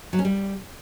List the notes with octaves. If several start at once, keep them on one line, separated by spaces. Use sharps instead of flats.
F#3
C#4
G3